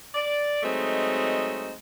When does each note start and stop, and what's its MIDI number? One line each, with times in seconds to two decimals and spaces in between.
0.15 0.61 74
0.63 1.74 54
0.63 1.74 56
0.63 1.74 57
0.63 1.74 60
0.63 1.74 63